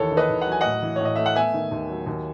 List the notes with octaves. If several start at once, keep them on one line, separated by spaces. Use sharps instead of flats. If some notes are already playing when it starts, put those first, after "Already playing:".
Already playing: D#2 E3 A4 C#5
D#3
B4 D#5
D#2
F#3 F#5
G#5
A2 D#5 F#5
E3
A2 C#5
D#5
A3 E5
F#5
B3 E5 G#5
D#3
D#2
F#3
D#2